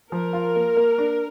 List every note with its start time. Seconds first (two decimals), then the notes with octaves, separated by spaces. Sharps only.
0.11 F3 A#4
0.33 F4
0.56 A#3
0.77 A#3
0.98 D4